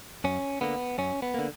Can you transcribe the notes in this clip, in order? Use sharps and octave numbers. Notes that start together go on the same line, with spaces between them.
F#2 C#4
D3 A#3 B3
F#2 C#4
B3
D3 A#3